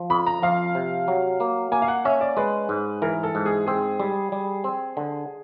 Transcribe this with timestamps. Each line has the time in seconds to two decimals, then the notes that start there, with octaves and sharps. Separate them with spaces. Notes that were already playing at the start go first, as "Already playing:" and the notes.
Already playing: F3
0.10 F2 B5
0.27 A#5
0.43 F3 F5
0.75 C3
1.08 F#3
1.40 A#3
1.72 A#3 G#5
1.82 F5
1.88 F#5
2.05 C#4 E5
2.21 D5
2.37 G#3 B4
2.69 G#2
3.02 E3 A#4
3.23 A4
3.35 G#2
3.46 G#4
3.66 C4 G#4
4.00 G3
4.32 G3
4.64 C4
4.97 D3